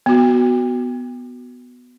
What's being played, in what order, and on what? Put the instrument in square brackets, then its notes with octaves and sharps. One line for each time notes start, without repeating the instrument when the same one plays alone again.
[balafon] B3 F#4